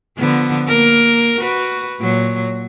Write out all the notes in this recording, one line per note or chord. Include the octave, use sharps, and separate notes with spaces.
D3 F3 B3
A#3 A#4
F#4 B4
A#2 F#3